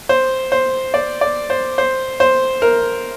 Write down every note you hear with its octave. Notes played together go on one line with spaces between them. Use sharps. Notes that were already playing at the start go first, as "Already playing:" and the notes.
C5
C5
D5
D5
C5
C5
C5
A#4